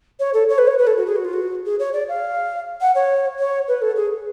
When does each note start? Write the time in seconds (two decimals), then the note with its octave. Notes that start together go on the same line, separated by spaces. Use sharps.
0.19 C#5
0.33 A4
0.49 C#5
0.58 B4
0.67 C#5
0.78 B4
0.86 A4
0.96 F#4
1.06 G#4
1.16 F#4
1.24 F4
1.33 F#4
1.65 G#4
1.79 C#5
1.93 D5
2.08 F5
2.81 F#5
2.95 C#5
3.38 C#5
3.68 B4
3.81 A4
3.96 G#4